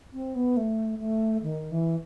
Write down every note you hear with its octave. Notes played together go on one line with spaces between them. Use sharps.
C4
B3
A3
A3
D#3
E3